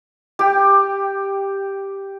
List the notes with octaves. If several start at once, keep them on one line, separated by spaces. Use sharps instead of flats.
G4 G5